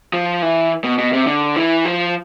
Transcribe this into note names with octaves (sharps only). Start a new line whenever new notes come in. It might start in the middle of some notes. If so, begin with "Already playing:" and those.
F3
E3
B2
B2
C3
D3
E3
F3